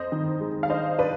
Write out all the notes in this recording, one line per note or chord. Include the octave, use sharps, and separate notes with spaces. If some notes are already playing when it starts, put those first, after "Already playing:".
Already playing: F2 C5 D#5
D#3
G#3
F5
D4 C5 D#5
D4 B4 D5